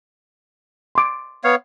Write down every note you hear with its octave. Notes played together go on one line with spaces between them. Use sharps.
C6 D6
B3 C#5 F5